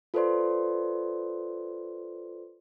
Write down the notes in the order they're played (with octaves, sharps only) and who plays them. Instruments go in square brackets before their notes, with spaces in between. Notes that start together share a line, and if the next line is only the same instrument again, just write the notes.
[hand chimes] F4 A4 B4 C5 D5 C6